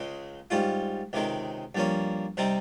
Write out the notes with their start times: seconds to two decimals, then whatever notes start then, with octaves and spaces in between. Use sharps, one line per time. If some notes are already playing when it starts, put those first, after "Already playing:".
Already playing: C#2 C#3 G#3
0.50 G#2 G3 C#4 F4
1.13 C#2 C3 D#3 G#3
1.75 G2 F3 A#3 C#4
2.37 C3 G3 C4 D#4